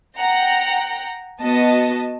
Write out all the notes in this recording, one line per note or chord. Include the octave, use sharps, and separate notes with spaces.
F#5 G5 A#5
B3 F#4 D#5 A5